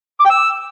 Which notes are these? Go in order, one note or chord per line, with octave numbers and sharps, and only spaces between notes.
D6
G5
E6